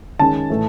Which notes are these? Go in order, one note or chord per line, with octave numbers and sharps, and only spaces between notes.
D#3 G#3 C#4 A5
A2 E3 A3